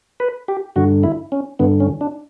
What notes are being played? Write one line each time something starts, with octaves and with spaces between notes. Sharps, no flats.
B4
G4
G2 D3 F#4
E4
C#4
G2 D3 B3
C#4
D4